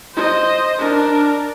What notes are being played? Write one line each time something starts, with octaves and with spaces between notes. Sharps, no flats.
C5 D#5
D4 A#4